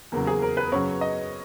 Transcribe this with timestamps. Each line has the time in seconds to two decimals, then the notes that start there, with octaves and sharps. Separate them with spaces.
0.12 E2 C#3 F#3 A#3
0.27 G#4
0.42 A#4
0.57 B4
0.72 F#2 C#3 F#3 C#5
1.01 D#5